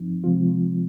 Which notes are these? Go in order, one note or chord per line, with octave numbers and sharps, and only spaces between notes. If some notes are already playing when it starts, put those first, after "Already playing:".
Already playing: G2 F3 C4 D#4
C3 F3 G#3 C4 F4